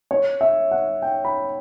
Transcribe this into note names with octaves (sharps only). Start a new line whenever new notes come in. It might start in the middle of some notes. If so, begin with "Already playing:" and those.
C#5
E5
F#5
G5
B5